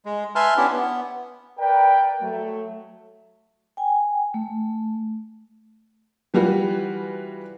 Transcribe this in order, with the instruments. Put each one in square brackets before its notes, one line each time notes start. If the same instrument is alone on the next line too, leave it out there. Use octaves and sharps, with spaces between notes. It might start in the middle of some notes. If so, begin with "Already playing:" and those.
[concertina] G#3
B4 E5 G#5 A5 C6 F6
B3 C#4 D4 E4 G4
B3
[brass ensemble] A#4 B4 D5 G5
F#3 A3
[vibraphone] G5 G#5
A3
[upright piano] E3 G3 F4 F#4 B4